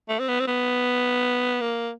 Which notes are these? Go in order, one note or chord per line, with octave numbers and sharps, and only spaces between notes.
A3
C4
B3
C4
B3
A#3